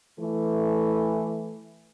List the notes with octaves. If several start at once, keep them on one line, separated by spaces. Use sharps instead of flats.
E3 A3